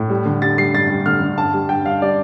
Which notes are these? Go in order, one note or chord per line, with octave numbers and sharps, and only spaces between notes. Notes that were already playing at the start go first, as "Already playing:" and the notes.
Already playing: A2
G3
D3
G3 A6
G3 C7
G2 A6
G3
D3 F6
D3
G2 A5
G3
G2 G5
G2 F5
G3 D5